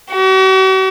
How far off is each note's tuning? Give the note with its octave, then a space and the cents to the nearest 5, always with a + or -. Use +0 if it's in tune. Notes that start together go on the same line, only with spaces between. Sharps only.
F#4 +45